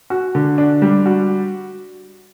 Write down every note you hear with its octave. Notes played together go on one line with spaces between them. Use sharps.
F#4
D3
D4
G3
F#4